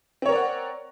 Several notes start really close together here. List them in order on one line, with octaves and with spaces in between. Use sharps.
C4 C#5 A#4 D5 F#5